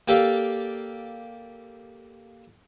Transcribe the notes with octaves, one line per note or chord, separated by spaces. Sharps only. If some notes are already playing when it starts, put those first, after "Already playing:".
A#3 G4 A4 D5 F5